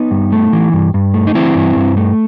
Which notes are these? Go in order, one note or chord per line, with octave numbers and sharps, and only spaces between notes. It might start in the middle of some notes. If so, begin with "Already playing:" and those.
Already playing: B3 D#4
G2
A3
E3
G2
G2
A3
D#4
E3 C4 E4
G2
G2
A3